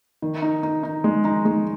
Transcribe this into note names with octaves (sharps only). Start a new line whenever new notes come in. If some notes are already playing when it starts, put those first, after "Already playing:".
D#3
D#4
D#4
D#4
G#3
D#4
G#3